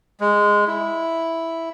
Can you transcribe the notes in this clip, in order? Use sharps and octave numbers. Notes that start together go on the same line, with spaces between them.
G#3
E4